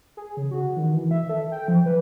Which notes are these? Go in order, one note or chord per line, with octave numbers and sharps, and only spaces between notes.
G#4
C#3
F#4
D#3
E3
E5
A4
G5
F3
B4